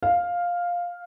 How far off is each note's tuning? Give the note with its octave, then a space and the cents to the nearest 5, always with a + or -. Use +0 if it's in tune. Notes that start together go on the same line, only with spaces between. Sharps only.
F5 +5